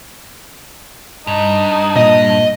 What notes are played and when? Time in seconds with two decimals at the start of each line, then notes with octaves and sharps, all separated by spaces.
1.27 G2 D#4
1.96 A#2 A#3 D#5